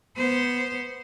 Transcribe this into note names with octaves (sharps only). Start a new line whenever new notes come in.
B3 C5